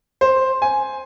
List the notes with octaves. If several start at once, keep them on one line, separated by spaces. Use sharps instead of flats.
C5
G#5